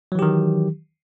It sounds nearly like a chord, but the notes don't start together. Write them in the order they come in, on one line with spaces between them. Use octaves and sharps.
F#3 E3 G4 D#3